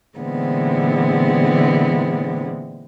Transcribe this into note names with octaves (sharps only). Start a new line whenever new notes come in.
A#2 D3 E3 G#3 B3 C4